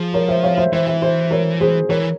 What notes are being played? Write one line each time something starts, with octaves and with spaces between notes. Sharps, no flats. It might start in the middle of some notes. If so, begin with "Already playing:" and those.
Already playing: F3 G#4
A#4 C#5
C5 E5
C#5 F5
C5 E5
E3 C5 E5
C5 E5
C5 E5
A#4 C#5
G#4 C5
E3 A#4 C#5